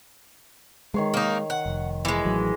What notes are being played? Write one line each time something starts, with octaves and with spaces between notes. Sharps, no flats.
D#3 G#3 C#5 C6
A#3 D#4
F#5
F1
E3 G#3
A1 F#3